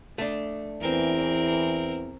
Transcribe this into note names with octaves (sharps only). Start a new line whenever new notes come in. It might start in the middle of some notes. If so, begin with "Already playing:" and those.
A3 D4
E2 E3 C4 A#4